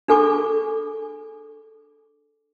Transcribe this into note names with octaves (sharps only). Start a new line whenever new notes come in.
D4 G#4 A4 G#5 C#6 D6